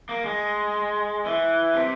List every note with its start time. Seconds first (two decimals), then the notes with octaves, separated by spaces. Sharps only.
0.09 A#3
0.25 G#3
1.26 E3
1.75 C3